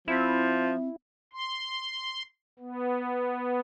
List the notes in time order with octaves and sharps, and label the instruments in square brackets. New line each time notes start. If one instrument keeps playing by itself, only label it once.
[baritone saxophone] F3 [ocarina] C4 [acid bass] E4
[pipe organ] C6
B3